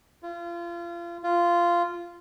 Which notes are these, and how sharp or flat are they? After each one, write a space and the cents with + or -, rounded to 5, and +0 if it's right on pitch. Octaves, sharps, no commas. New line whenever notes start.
F4 -30
F4 -10